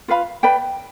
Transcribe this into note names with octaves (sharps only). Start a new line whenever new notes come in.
F4 B4 F5 B5
B4 D5 G5 B5